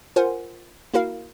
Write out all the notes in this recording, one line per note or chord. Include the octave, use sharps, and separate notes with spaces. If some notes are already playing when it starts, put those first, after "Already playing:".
F4 A#4 C5 F#5 G#5
A#3 E4 F#4 A#4 F5